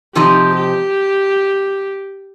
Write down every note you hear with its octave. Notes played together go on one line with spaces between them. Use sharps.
C3 F3 C4 D#4 G4
G4